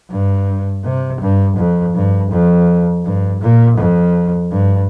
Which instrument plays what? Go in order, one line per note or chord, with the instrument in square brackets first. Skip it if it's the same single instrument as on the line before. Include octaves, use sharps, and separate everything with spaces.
[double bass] G2
C3
G2
F2
G2
F2
G2
A#2
F2
G2